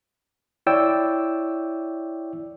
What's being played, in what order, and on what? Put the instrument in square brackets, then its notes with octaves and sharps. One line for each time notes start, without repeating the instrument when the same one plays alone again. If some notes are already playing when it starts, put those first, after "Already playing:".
[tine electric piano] E4 C#5 D5 G5 E6